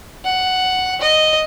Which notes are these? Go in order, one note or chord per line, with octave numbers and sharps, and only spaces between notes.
F#5
D#5